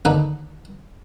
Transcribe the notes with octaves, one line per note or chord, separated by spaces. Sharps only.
D#2 D3 D#4 B4 D5